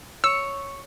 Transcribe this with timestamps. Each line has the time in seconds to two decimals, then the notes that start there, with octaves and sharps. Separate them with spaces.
0.24 C#5 E6